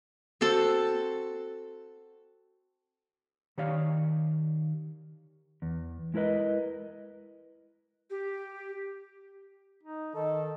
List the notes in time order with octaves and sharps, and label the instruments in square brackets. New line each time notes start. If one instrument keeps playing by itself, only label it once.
[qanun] C4 F#4 A4 A5
[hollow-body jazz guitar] D#3 G4 C#5 D5 F5
[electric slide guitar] E2
G#3 E4 A#4 B4 D#5
[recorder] G4
[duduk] D#4
[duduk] D#3 [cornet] A4 [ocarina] D#5